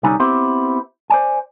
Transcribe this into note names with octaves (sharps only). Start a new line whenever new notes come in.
C2 D3 G3 C#4 D#4 G#5
B3 C4 E4 G4 C5
C5 D5 G#5